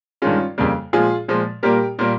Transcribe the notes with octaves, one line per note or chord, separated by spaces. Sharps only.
G2 D#3 G#3 C#4 F4
F2 C#3 G3 A#3
A#2 F3 G#3 F4 G#4
A#2 F3 G#3
A#2 G3 A#3 G4 A#4
A#2 G3 A#3